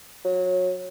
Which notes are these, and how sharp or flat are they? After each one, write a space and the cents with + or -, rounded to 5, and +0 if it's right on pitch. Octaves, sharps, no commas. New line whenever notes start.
F#3 -20